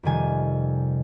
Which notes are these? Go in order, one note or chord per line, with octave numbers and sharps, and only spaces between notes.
F2 C3 D#3 G3 G#5